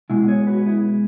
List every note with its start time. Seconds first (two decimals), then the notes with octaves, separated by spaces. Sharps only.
0.10 B1 B2 G#3 E4
0.28 G#4 C#5
0.47 F#4 B4
0.66 E4 G#4